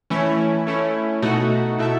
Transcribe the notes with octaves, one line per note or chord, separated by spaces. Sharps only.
E3 A3 C#4 E4
A3 C#4 E4
B2 A3 D#4 F#4
B2 A3 E4 A4 E5